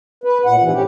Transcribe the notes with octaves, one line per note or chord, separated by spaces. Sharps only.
B4
A#2 F#5
G#2 C3 E3
A2 C#4 G4